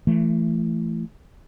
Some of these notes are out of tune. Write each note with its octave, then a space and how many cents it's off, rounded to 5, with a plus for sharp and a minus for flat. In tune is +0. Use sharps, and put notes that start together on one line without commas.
E3 +30 A3 +10